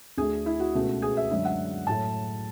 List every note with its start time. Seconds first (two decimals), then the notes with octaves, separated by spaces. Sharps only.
0.17 D2 D3 A3 G#4
0.46 E4
0.60 F#4
0.75 C#2 B2 A3
1.02 G#4
1.17 E5
1.31 F#2 D3 G#3 E5
1.45 F#5
1.87 A2 F#3 A3 A5